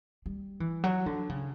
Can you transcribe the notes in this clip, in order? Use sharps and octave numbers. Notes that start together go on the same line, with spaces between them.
G3
E3
F#3
D3
C#3